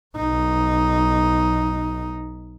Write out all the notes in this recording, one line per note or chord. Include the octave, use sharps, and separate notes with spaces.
B1 D#4